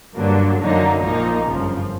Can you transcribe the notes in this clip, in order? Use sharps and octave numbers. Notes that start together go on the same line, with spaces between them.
G2 D3 F#3 A#3 D4
F#2 D3 F#3 A#3 D#4
A#1 A#2 F3 A#3 D#4
G1 F#2 C#3 F3